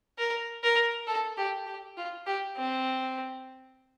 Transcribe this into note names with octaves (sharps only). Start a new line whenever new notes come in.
A#4
A#4
A4
G4
G4
F4
G4
C4